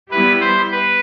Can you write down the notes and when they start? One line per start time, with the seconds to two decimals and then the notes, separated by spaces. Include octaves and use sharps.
0.11 G3 B3 E4 G4 B4
0.41 C5
0.72 B4